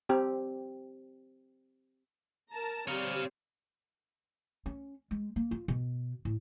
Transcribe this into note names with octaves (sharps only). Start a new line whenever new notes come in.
C4 G4
A#4 A5 A#5
G3 C4 C#5 F5
C#4
G#3
A#3
F4
B2
A2